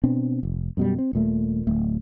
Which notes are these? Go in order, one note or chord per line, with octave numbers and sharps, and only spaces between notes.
B2 C4 D4
F1
F#2 B2 G3
C4
D#1 A#2 A3
D1 A3